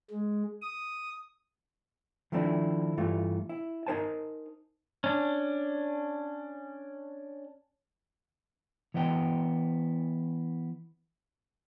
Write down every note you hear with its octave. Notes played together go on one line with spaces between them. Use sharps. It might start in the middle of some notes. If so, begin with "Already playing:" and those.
G#3
D#6
D#3 F3 A3 C4 D4 E4
G2 E3 A3 F4
E4
D#4 A#4 C5 G#5 A5
C#4 D4
E3 B3 C5 D#5 G5 A5